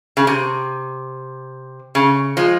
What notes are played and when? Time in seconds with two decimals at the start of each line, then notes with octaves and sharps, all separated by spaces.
0.17 C#3
0.27 C3
1.95 C#3
2.37 F3 G#3